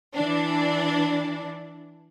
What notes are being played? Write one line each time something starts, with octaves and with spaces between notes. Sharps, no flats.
E3 D4